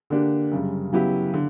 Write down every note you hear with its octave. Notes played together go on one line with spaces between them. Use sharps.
D3 A#3 D4 G4
F#2 C#3 G3
C#3 F#3 B3 E4 G4
D3